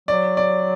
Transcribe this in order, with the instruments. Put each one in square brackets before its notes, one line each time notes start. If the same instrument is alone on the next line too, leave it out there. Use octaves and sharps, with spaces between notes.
[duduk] F#3 [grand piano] D5
[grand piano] D5